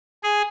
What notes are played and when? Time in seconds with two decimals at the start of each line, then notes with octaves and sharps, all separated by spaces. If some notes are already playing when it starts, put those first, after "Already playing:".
0.23 G#4